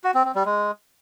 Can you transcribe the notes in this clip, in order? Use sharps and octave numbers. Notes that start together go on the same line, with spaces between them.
F#4
C4
C4
G3
G#3